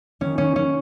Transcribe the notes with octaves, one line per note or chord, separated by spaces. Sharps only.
D#3 C#4
C#4
C#4